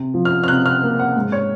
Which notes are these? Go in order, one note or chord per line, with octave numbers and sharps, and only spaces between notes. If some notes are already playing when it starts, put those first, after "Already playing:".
Already playing: C3
F3
F6
F6
C3 F#6
F6
A#3
F#5
G#2
C#5